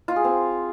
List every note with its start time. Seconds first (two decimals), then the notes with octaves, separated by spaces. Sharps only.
0.08 F4
0.16 G#4
0.24 C4